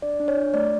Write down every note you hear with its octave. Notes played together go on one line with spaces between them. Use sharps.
D4 D5
D4
C#5
F4
A3 D5